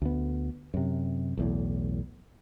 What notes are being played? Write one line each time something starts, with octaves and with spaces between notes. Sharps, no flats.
D2 B3
F#2 C3
B1 E2 A2